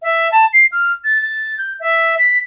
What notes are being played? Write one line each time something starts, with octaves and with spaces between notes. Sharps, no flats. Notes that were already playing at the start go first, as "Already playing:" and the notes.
E5
A5
C7
F6
A6
A6
G6
E5
B6